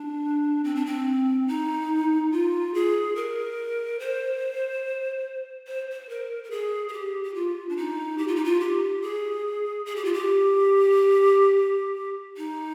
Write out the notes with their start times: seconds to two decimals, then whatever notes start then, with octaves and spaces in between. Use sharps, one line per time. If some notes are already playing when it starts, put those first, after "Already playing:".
Already playing: D4
0.64 C4
0.75 D4
0.86 C4
1.48 D#4
2.32 F4
2.74 G#4
3.16 A#4
3.99 C5
5.67 C5
5.92 C5
6.09 A#4
6.44 A#4
6.51 G#4
6.89 G#4
6.93 G4
7.23 G4
7.35 F4
7.69 D4
7.77 D#4
8.18 G4
8.28 F4
8.36 D#4
8.45 F4
8.60 G4
9.02 G#4
9.86 G#4
9.96 G4
10.05 F4
10.14 G4
12.37 D#4